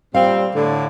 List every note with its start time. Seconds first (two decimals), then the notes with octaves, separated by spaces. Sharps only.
0.15 A#2 G3 C4 F5
0.55 A2 D3